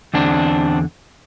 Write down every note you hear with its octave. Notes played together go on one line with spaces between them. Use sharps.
E2 D3 C4 D4